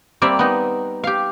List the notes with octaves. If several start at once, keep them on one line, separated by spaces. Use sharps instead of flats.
G3 A#3 C4 D5 E5 F5
B3 D#4
G4 F5